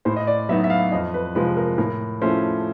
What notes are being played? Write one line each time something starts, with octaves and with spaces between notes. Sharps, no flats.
A2 C5
D#5
D5
F#3 B3 D#4 E5
E5
F5
F2 D#5
B4
C3 F3 G#3 B4
A#4
A2 A#4
F3 A3 C#4 E4 C5